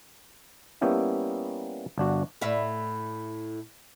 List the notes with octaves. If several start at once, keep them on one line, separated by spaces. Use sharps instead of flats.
G3 A#3 B3 C#4 E4 G5
G1 D4 F#4
A2 E5